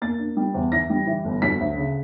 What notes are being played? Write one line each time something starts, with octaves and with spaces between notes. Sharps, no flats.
A#3 A6
D4
G3
E2
E3 A#6
G3
E3
G1
F#3 B6
D2
C#3